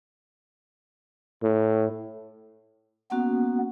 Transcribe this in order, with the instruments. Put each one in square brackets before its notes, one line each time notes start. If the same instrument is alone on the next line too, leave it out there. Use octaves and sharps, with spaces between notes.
[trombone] A2
[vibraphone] A#3 C#4 F#4 [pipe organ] B3